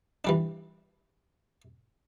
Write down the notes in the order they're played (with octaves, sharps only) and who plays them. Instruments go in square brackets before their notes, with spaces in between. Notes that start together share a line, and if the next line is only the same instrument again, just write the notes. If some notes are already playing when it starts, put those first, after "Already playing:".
[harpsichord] E3 G3 D4